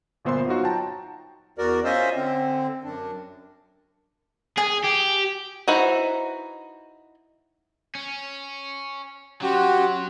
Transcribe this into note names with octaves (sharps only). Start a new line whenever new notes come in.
G1 A#2 B3 C5 E5 C6
F#3 D#4 F4 F#4 C#5
G5 A5 A#5
E2 F#4 A#4 D5
C#4 F4 C5 D#5 E5
D3 C4
F#2 D4
G#4 G#5
G4
D#4 E4 F#4 B4 C5
C#4
F#3 C#4 F#4 G4 C6